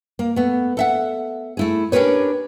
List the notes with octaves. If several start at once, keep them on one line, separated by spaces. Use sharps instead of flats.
A#3
A3 B3
A4 E5 F#5
A3 E4 G#4
C#4 D4 G4 A#4 B4 C#5